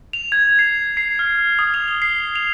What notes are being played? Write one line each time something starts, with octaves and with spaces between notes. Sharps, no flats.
F7
G#6
C7
C7
F6
D#6
F7
G7
C7
F7